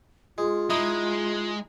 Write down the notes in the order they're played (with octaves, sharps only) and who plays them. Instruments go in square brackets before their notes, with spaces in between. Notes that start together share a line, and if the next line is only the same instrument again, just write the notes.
[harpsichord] G#3 [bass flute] F4
[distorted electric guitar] G#3 [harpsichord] D#4 E4 D#5